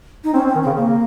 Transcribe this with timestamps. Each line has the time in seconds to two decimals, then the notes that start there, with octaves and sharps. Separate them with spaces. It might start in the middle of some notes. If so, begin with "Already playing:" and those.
0.24 D#4
0.34 C4 C#4
0.44 C4
0.48 C#4
0.55 D#3
0.62 C#3 C4
0.76 C#3 A#3